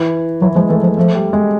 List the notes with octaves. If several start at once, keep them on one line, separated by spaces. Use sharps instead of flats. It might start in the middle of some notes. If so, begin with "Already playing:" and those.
Already playing: E3
E3 F#3
F3 G#3
E3 A3
F3
F3 A3
G3
G#3